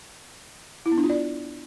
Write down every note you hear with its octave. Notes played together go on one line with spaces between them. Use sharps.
E4
B3
D4
F4
D5